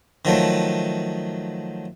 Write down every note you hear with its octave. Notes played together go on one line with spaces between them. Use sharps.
D#3 F3 F#3 A3